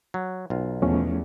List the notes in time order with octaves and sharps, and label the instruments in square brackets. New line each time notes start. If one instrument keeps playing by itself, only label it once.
[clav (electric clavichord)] F#3
B1 F4
[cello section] E2 [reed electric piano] F3 A3 C#4